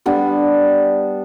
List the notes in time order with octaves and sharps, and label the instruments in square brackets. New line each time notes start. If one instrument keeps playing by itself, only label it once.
[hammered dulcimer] G3 B3 D4